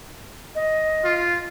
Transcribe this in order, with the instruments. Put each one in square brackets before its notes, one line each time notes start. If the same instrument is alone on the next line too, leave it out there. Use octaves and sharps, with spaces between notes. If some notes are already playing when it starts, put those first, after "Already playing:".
[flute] D#5
[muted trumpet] F4